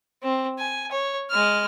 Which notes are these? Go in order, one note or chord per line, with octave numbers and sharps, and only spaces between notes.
C4
G#5
C#5
G#3 F6